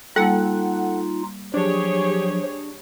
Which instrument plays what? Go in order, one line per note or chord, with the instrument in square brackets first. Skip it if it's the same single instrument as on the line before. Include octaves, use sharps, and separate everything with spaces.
[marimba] G3 A#3 [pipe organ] D#4 F4 [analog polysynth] A4 F#5
[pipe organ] F3 F#3 [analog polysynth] D4 [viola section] G4 G#4 C#5